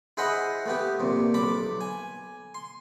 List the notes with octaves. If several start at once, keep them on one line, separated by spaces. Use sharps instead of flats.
E4 G#4 C5 D#5 F#5 B5
A3 B3 G4
A#1 C3
B1 A5 B5 D6
G#5
C6